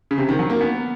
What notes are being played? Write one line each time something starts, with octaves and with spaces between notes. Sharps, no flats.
C#3
C3
D#3
F#3
A#3
B3